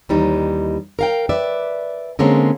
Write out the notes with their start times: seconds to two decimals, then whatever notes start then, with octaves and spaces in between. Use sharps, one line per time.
0.09 D#2 E3 G3 D#4
0.99 A#4 F5 G5
1.29 B4 D5 E5
2.19 D3 G#3 A#3 C4 C#4